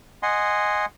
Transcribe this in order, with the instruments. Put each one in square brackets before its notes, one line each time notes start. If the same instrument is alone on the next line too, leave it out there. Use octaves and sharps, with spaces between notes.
[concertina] D#5 F#5 G#5 C6